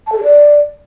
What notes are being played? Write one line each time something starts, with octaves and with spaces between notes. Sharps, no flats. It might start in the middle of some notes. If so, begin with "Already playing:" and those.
A5
A4
G#4
D5